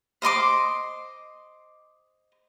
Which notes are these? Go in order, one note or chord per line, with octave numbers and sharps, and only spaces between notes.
C5 D#5 C6 D6